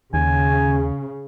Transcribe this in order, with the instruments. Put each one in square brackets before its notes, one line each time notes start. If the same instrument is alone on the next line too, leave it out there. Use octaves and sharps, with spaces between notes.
[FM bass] D#2 [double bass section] C#3 [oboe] G#5